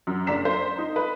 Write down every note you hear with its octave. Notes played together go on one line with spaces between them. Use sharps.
F#2
F#1 D4 A#5 B6 E7
C5
D#4
B4